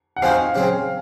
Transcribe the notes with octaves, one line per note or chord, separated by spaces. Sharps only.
F#5
F3 C4 D#4 F#4 C5 F5 G#5
C#3 F#3 C4